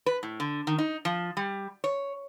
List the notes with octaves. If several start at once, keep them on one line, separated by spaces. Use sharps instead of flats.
B4
A2
D3
D#3
D#4
F3
G3
C#5